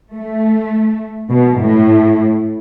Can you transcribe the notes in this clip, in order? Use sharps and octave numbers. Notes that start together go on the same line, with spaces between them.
A3
B2
A2